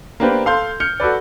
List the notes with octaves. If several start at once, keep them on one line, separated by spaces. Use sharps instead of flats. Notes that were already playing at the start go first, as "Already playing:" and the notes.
A#3 B3 D4 G4 B4 C5
A4 F5 C6 G6
F6 G6 C#7
F#4 A4 B4 D5